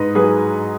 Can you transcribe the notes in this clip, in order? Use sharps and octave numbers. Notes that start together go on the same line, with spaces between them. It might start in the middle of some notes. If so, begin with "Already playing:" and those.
Already playing: G#2 B4 D#5
F#3 G#4 B4